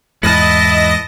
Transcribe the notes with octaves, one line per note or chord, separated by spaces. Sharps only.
E2 G#2 E4 B4 D#5 A5 A#6